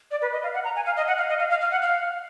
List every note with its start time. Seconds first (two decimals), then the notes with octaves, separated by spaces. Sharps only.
0.11 D5
0.22 B4
0.32 D#5
0.43 F5
0.54 F#5
0.64 A#5
0.76 G#5
0.86 F5
0.97 D#5
1.07 F#5
1.18 F5
1.29 D#5
1.40 F5
1.50 F5
1.61 F5
1.72 F#5
1.82 F5